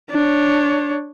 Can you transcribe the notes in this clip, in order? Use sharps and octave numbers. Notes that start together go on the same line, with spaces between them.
D4 C#5